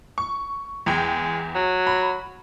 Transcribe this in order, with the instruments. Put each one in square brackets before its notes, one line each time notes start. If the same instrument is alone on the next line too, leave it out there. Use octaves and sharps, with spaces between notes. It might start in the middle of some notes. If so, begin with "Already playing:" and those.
[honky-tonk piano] C#6
[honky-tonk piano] E2 G5 [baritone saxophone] G#3
[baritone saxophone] F#3
[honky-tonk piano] B5